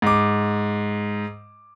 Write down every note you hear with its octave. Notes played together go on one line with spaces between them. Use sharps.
G#2 D6